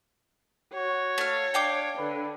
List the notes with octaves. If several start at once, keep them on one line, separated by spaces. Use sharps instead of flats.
F#4 C#5
A3 F5
D4 F5 G5 D6
D3 B4